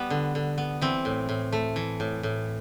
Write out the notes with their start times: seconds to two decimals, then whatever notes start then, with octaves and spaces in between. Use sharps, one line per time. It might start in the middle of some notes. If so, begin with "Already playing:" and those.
Already playing: G3 B3
0.10 D3
0.35 D3
0.58 B3
0.81 E3 C4
1.05 A2
1.29 A2
1.53 A3
1.76 E3
2.00 A2
2.23 A2